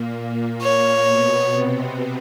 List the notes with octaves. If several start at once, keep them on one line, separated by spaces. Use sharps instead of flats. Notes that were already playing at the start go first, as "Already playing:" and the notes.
Already playing: A#2 A#3
C#5
B2 B3
C3 C4